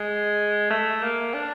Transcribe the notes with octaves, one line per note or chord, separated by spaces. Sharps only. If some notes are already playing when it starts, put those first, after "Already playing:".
Already playing: G#3
A3
A#3
D4